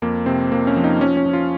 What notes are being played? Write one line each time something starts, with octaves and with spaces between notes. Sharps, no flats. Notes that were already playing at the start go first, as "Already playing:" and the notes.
F2 A#3
C3 C4
F2 A#3
C#4
F3
D#4
F3 C#4
C#4
F3
F4